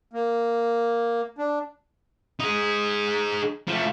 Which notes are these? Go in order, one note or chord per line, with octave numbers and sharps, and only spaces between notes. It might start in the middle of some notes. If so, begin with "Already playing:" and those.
A#3
D4
D#4 G#4
F3 A3